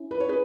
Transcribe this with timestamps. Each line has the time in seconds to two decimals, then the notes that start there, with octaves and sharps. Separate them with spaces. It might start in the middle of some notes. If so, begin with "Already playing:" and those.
Already playing: C#4 E4
0.11 B4
0.20 C#5
0.29 G#4 B4